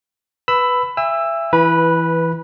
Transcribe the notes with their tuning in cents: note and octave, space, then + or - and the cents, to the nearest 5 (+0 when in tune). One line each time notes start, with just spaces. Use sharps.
B4 +0 B5 +15 E6 +0
E5 +25 G#5 -40 E6 +10
E3 +0 B4 -5 B5 -35